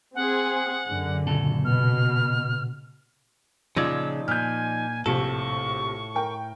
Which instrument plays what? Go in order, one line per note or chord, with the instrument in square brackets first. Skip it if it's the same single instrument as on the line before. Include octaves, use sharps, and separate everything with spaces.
[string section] C4 G#4 [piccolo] F#5
[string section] F#2 D3
[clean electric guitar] A#2 C#3 A4
[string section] B2 [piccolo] F6
[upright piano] A#2 G#6 [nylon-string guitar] C#3 [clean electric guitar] F3 D#4 D5 [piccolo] E6
[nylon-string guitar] A#2 [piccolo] G#5 [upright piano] F6 G6
[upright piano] A#1 C3 C#7 [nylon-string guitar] A2 [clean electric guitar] A4 [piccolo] C#6
[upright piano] A#4 G5